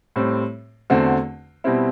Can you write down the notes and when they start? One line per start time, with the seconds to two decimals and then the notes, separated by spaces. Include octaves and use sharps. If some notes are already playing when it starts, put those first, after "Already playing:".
0.16 A2 G3 C4
0.90 E2 D3 A3 C4 F#4
1.64 B2 G3 C4 E4